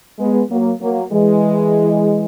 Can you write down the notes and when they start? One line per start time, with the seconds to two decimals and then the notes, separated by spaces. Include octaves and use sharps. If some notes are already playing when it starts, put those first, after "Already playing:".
0.19 G#3 B3
0.50 F#3 A#3
0.81 F#3 A#3
1.12 E3 G#3